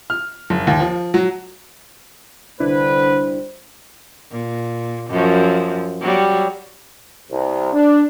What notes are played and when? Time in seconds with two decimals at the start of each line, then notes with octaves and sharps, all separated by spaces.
0.10 F6
0.50 F#1
0.67 D#2
0.80 F3
1.14 F#3
2.60 C2 D3 G3 D4 E4 B4 C5
4.32 A#2
5.10 F#2 F3
6.01 F#3 G3
7.31 C2
7.73 D4